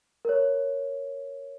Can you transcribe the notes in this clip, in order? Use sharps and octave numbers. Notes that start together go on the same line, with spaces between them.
A#4 C#5